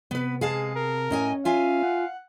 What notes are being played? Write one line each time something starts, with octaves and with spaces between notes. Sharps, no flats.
C3 B3 B4
G#3 G#4 F5 A5
A#4
A2 C#4 D#5 G#5
F4 E5 F5 G#5
F#5